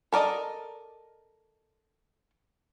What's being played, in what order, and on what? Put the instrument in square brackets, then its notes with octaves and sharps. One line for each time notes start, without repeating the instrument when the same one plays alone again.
[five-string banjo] A4 A#4 D5 D#5